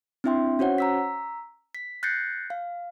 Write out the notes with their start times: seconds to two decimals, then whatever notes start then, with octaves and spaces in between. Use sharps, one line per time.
0.24 C4 D4 E4 E5 G5 C6
0.59 C#4 F#4 C5 C#5 F#5
0.78 A#5 E6 B6
1.75 B6
2.03 F#6 G6 A6 A#6 C7 C#7
2.50 F5